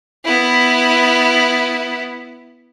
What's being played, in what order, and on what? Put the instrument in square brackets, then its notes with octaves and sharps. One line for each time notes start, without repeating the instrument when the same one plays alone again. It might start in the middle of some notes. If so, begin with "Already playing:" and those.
[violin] B3 E4